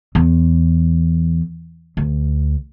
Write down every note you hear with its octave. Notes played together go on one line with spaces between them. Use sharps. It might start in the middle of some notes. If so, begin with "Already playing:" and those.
E2
D2